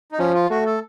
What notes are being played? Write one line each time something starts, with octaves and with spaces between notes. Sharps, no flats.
D#4
F3 C#4
F4
A3 F#4
A4